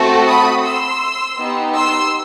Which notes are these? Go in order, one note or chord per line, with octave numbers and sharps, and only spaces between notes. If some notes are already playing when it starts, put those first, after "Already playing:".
Already playing: A3 C4 F#4 A4
B5 D#6
C6 E6
B3 D#4 G4
C6 E6